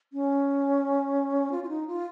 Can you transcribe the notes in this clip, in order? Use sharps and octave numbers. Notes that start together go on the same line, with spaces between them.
C#4
F4
F4
D#4
F4